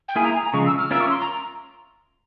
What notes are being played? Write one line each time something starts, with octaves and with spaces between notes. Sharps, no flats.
G5
A#3 E4 G#4 G#5
A#5
G#5
A#5
C#3 F3 G#3 C#6
E6
F6
C#4 F4 A#4 E5 E6
C#6
C6
A#5